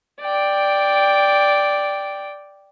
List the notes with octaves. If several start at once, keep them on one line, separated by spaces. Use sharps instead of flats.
D5 G5